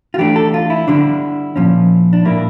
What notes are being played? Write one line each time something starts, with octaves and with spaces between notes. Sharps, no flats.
F4
E3 A3 D4 G4
A4
F4
E4
D3 G3 D4
A#2 F3 C#4
D4
A#2 G3 A#3 D4 E4